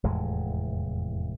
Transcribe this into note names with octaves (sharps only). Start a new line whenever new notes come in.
F1 E2 A2 G#3